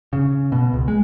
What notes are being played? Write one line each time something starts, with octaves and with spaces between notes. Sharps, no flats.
C#3
B2
C#2
G#3